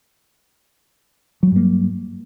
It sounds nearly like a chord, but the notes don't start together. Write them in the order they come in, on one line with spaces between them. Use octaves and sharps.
F#3 G3 G2 A#3